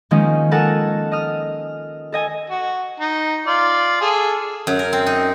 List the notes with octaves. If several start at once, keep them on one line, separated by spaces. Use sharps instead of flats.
D#3 F3 G#3 A#3 C#4 D#4
A4 A#4 D#5 F#5 G#5 A5
D#5 D#6 F6
A4 D#5 G#5
F#4
D#4
F4 D5
G#4 A4
F#2
A#4
C4
D#4